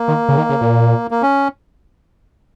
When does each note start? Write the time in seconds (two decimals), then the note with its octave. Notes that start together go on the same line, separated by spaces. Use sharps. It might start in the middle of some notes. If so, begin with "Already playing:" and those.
Already playing: A#3
0.08 D#3
0.29 C#3
0.38 D#3
0.49 C#3
0.61 A#2
1.11 A#3
1.22 C#4